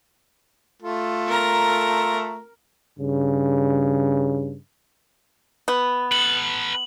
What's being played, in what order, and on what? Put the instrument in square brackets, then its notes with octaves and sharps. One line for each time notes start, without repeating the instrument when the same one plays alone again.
[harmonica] A3 F4 A4
[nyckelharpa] A#4 A#5
[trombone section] G2 C#3
[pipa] B3
[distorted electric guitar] A4 B4 [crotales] F#7